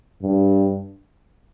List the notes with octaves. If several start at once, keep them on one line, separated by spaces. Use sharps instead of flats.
G2